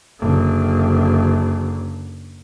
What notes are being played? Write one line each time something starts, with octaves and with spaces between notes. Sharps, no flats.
F#1 D3